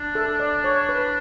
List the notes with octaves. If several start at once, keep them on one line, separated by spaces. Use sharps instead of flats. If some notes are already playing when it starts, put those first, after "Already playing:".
Already playing: D4
A4
D5
C#5
B4